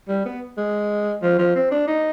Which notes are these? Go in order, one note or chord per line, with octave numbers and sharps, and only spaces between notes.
G3
B3
G#3
F3
F3
C4
D4
D#4